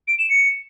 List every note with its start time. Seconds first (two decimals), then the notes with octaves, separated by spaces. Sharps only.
0.07 D7
0.18 E7
0.29 C#7